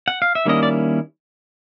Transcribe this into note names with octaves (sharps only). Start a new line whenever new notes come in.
F#5
F5
E5
D#3 G3 A#3 C#4 E4 D#5
D5